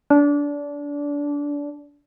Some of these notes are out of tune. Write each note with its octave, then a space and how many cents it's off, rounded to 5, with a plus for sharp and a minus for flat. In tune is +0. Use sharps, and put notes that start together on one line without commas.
D4 -25